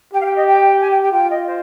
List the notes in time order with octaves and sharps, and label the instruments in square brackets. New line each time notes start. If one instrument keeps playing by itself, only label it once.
[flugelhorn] G4 [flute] G5
[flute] F5
G5
D#5
G5
G#5
G5
G5
[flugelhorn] F4 [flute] G5
[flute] D#5
C5